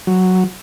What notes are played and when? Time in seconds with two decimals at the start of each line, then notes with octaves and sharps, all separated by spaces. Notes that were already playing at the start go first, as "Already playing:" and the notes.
0.07 F#3